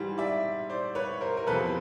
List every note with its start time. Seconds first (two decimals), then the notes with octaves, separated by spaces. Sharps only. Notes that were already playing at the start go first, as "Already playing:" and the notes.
Already playing: G#2 E3 G3
0.18 D5 E5
0.70 C5 D5
0.95 B4 C#5
1.21 A#4 C5
1.37 A#4
1.47 E2 C3 F3 A4 B4